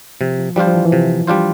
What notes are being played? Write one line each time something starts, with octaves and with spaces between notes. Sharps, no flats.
C3 F3
F3
F3 G3 D4 F4 C5
F3
E3
E3
C3 F3
G3 D4 F4 C5